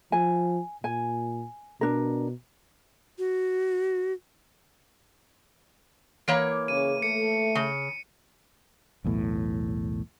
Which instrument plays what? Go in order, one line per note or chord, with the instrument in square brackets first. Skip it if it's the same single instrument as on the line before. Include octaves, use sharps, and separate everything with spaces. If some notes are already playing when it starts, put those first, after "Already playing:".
[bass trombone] F3 [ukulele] G#5
[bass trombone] A#2 [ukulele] G#5
[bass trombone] B2 [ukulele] D4 A#4
[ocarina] F#4
[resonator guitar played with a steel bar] E3 A#3 C#5
[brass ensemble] C#3 [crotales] D#7
[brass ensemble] A3 [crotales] C#7
[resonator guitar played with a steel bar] C#3
[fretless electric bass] B1 E2 A2